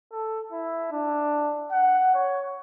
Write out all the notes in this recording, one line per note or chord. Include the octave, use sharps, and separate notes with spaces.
A4
E4
D4
F#5
C#5